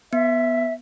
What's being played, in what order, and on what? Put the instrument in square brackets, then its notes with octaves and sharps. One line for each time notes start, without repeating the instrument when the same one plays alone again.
[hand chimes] B3 [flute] E5